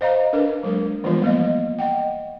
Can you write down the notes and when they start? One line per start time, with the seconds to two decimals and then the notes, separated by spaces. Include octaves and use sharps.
0.01 C5 D#5 F5 A#5
0.33 D4 A#4 B4
0.63 F#3 G#3 A#3 A#4
1.04 E3 F3 G3 G#3 B3 F4
1.22 A#3 B3 D#5
1.79 D#5 F#5 G5